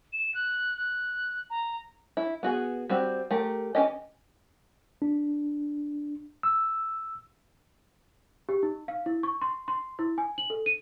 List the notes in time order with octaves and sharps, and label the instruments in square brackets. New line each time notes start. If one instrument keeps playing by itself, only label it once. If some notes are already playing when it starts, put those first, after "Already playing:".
[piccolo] E7
F#6
F#6
A#5
[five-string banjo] E4
B3 F#4 G#4
G3 C4 F#4
A3 G4 A#4
E3 C#4 G4 D#5
[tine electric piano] D4
E6
[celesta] G4
D#4
F5
E4
C#6
C6
C6
E4
G#5
F#7
A4
D#7